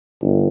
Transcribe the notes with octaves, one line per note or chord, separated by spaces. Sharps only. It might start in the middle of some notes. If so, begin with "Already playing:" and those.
G1